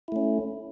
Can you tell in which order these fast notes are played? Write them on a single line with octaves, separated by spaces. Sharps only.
E4 A3 C#4